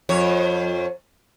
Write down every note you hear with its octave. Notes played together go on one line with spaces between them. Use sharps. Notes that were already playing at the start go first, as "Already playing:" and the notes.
F2 C#5